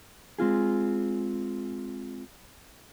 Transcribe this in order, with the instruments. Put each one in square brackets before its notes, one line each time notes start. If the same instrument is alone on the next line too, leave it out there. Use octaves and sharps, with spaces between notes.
[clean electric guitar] G#3 C4 F4 G#4